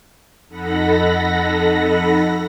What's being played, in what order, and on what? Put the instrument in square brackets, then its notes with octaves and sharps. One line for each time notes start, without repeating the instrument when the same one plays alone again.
[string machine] F2 D#4 A4 F#5 B5 A#6